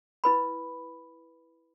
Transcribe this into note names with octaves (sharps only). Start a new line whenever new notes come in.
E4 B4 B5